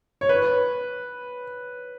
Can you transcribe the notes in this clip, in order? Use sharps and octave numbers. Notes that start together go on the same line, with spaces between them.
C#5
B4